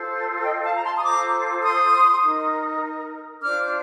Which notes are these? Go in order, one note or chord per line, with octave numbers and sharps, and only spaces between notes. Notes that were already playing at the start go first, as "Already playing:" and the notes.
Already playing: F4 A4 C5
D#5 G5
F5 A5
A#5
A5 C6
D#6
F4 A4 C5 A#5 D6
C6 D#6
D#4 A#4
D4 F4 C5 D6 F6